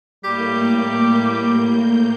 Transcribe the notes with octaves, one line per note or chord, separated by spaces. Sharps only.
A2 G3 A#3 G4 G6